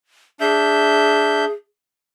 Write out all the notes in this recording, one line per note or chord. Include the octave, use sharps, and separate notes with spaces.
D4 G#4 E5 G6